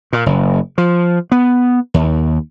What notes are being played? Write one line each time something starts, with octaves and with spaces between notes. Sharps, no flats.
A#2
F#1
F3
B3
D#2